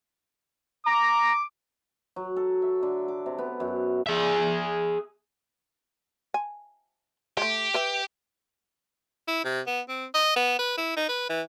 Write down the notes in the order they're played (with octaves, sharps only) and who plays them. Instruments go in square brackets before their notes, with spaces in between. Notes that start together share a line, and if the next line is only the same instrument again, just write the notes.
[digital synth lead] A#5 [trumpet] D6
[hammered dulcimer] F#3
A4
E5
D3
D6
C3
B3
F#2
[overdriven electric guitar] G#4 E5
[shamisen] G#5
[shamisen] G#3 A3 [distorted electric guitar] G4
[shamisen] B4 E5
[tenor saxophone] E4
C3
B3
C4
D#5
B3
B4
E4
D#4
B4
E3